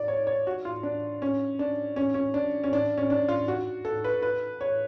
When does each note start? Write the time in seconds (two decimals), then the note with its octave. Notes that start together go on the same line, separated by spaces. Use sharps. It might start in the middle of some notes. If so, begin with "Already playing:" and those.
Already playing: D5
0.08 C#5
0.27 C#5
0.47 F#4
0.65 F4
0.83 D4
1.22 C#4
1.59 D4
1.96 C#4
2.14 C#4
2.34 D4
2.64 C#4
2.73 D4
2.97 C#4
3.10 D4
3.28 F4
3.48 F#4
3.85 A4
4.04 B4
4.22 B4
4.61 C#5